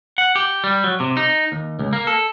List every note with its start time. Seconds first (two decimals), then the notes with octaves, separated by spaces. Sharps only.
0.18 F#5
0.36 G4
0.64 G3
0.84 F#3
1.00 C3
1.17 D#4
1.52 D#2
1.79 C#2
1.93 A#3
2.07 A4